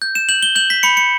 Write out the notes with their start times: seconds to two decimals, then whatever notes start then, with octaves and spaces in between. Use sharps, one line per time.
0.02 G6
0.15 E7
0.29 G6 F#7
0.43 G7
0.55 G6 F#7
0.70 B6
0.83 B5 C#7
0.97 C#7